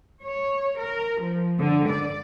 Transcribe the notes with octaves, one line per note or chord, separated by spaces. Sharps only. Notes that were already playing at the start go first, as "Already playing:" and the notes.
C#5
A#4
F3
D3
D5